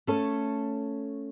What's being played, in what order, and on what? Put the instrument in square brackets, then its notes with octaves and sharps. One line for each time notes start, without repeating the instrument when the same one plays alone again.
[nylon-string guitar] A3 C#4 A4